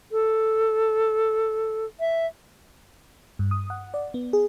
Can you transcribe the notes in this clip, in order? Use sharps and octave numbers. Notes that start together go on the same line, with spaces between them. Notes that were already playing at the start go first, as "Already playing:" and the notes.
A4
E5
G2
D#6
F#5
D5
B3
G#4